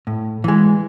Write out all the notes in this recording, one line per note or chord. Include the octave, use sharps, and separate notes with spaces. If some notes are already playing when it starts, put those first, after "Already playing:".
A2
E3 G#3